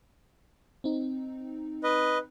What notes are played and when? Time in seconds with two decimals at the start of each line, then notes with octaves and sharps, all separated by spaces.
0.84 C4 D#4
1.84 B4 D#5